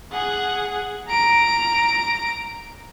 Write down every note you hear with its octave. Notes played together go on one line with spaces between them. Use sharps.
G#4 F#5
A#5 D7